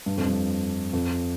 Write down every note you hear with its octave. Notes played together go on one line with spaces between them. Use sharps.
G2
F2
G2
F2